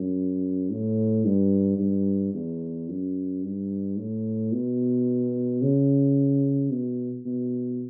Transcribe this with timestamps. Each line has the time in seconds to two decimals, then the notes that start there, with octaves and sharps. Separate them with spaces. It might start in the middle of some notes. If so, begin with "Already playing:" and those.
Already playing: F#2
0.70 A2
1.25 G2
1.79 G2
2.34 E2
2.89 F#2
3.43 G2
3.97 A2
4.52 B2
5.62 C#3
6.71 B2
7.26 B2